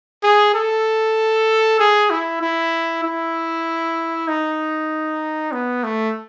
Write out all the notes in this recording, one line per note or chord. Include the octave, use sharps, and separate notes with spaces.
G#4
A4
G#4
E4
E4
E4
D#4
B3
A3